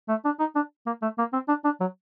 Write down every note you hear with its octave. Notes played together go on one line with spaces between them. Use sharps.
A3
D4
D#4
D4
A#3
A3
A#3
C4
D4
D4
F#3